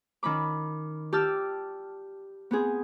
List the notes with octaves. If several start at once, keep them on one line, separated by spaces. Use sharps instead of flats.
D#3 C#4 B5 D6
G4 D5 A5 E6 F6
B3 C4 G#4